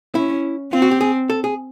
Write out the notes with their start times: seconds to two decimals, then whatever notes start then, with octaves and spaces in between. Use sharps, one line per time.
0.15 C#4 E4
0.73 C4 F4
0.82 F#4
0.91 G4
1.01 G#4
1.30 A4
1.44 G#4